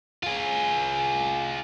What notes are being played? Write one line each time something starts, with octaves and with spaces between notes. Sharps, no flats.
F4 G#4